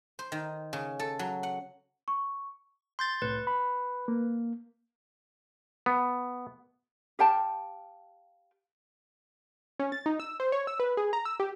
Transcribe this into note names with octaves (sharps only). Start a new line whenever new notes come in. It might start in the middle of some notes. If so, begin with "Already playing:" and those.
C5
D#3
C#3
A4
F#3
F#5
C#6
C6 G6 A6
C2 A2 B4
B5
A#3
B3
G4 F5 G5 A5
C#4
A6
D#4
E6
C5
C#5
E6
B4
G#4
A#5
E6
G4